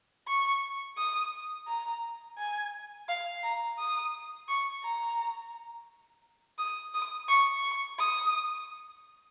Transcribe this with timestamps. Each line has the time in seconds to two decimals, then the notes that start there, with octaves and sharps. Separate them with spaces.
0.27 C#6
0.97 D#6
1.67 A#5
2.38 G#5
3.09 F5
3.43 A#5
3.79 D#6
4.48 C#6
4.83 A#5
6.58 D#6
6.94 D#6
7.29 C#6
7.63 C#6
7.99 D#6